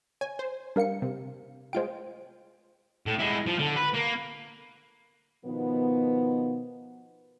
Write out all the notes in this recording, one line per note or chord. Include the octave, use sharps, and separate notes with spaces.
C#5 G#5
C5
G3 D4 A#4 F5 C#7
C3
G#3 F4 C5 G5 D7
A2
G#3 E4
F3
D3
B4
A#3
B2 D#3 F3 B3